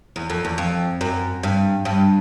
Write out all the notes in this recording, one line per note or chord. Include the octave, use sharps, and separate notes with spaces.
E2
F2
E2
F2
F#2
G2
G2